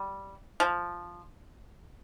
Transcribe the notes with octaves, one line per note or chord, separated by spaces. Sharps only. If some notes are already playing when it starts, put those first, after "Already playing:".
Already playing: G3
F3